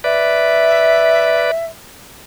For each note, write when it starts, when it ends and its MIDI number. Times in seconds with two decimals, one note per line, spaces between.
0.04 1.51 71
0.04 1.51 74
0.04 1.66 76